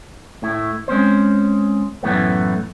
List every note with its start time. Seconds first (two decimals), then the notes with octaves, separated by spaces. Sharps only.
0.42 A2 A3 E4
0.88 G#3 C4 C#4 C5
2.03 F#2 A2 E3 A3 B3